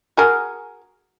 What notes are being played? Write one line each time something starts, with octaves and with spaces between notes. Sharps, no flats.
F#4 G#4 A#4